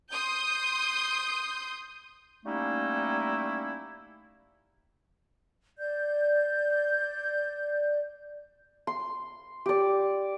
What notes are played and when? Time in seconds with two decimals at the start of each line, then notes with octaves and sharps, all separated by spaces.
0.11 C6 D#6 G6
2.45 G3 A3 A#3 C#4 D#4 E4
5.78 D5 G6
8.87 C6
9.66 G4 D5